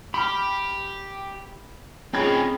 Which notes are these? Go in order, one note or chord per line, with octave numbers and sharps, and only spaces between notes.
G4 B5 F6
F3 C4 C#4 D#4 G#4 B5 G#6